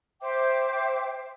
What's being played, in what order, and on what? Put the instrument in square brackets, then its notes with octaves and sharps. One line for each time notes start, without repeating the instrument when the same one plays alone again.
[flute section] C5 E5 G5 D6